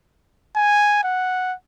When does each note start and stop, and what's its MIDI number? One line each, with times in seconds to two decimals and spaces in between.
0.56 0.99 80
1.04 1.54 78